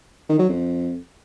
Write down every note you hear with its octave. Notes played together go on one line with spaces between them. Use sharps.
D#3
F#3
F2